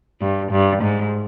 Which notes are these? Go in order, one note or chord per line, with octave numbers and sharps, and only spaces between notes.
G2
G2
G#2